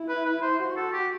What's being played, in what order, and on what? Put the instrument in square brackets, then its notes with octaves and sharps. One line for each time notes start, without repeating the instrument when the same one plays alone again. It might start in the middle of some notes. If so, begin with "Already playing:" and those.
Already playing: [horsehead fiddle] E4
[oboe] B4
B4
C5
[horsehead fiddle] F#4 [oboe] C5
[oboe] A4
G4